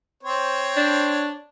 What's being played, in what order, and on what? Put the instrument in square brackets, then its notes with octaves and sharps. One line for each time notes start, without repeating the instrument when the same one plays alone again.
[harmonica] C4 C5 C#5
[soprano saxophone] D4